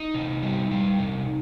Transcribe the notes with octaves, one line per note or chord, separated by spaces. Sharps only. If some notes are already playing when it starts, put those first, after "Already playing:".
Already playing: D#4
C3
G3
G3
C3